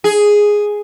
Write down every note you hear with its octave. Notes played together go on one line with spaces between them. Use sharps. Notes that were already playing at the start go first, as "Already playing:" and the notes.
G#4